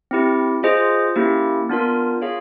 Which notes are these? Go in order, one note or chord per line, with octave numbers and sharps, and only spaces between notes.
C4 E4 G4
F4 G#4 C5 D#5
A#3 C#4 E4 G4
B3 D4 F4 A#4
F4 G#4 C#5 F5